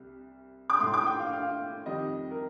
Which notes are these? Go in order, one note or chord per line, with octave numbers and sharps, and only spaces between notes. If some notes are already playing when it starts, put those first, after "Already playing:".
Already playing: C2 C3 G3
D6
A2 A3 C6
D6
G5
F5
F5
F2 D#3 G3 D#5
A#4